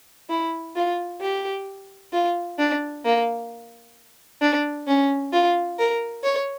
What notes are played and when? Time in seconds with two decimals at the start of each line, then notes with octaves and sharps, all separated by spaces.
0.29 E4
0.76 F4
1.21 G4
2.13 F4
2.59 D4
3.05 A#3
4.42 D4
4.87 C#4
5.33 F4
5.79 A#4
6.23 C#5